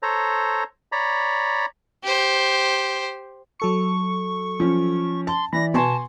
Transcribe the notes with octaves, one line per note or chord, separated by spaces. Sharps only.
A4 C5 C#5 A#5
C#5 D5 A#5 B5
G4 C5
F#3 A4 C#6 C#7
F3 C#4
A5 C6
E3 D5 B5 A#6
B2 B3 G#5 A5 C6 C#6